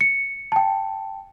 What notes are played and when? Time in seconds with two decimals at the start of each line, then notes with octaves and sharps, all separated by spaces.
0.01 C#7
0.52 G5 A5